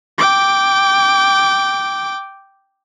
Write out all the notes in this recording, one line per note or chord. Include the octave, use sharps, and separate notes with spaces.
G5 D6